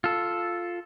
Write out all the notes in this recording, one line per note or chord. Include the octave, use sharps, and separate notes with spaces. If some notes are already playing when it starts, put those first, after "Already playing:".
F4 A4